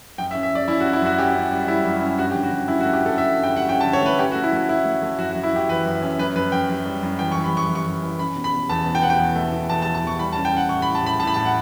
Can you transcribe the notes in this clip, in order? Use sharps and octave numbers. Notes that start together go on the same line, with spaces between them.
F#2 G5
E5
C#4
E5
C#4 D5
C#4 E4
F#4
C#4
E4
F#2 F#4
C#4 G4
C#4
G3
G3 E4
F#2
C#4
G2 F#4
G4
D3
F#4
D3
C#4 E4
F#4
A3
G4
C#4 A4
A3 E5
G2
G5
G2 F#5
C#4 G5
A5
D3
C#5
A3 B4
C#4 G4
F#4
A3
E4
A3 F#4
A3 E4
A3
A3
F#2 F#4
F#4
F#2
E4
F#2 G4
E3 B4
F#2
C#4
F#2 B4
F#2 B4
F#2 G5
F#2
G3
F#2
E3 G5
C#6
E3
B5
F#2 C#6
F#2
C#6
F#2
E3
C#4 B5
B2
B5
B2
E2 A5
B2
G5
B2 F#5
G5
E2
A3
B2
E2 A5
A5
A3
A5
E2 C#6
G3 B5
A5
C#4
G5
C#4 F#5
A2 C#6
B5
A2
A5
A2 B5
A2 A5
B5
A2 A5
F#5